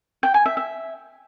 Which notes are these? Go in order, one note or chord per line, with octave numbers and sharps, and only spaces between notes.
G5
G#5
E5
E5